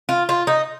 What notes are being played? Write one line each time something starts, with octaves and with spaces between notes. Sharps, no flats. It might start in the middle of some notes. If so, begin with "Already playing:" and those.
F4
F4
D#4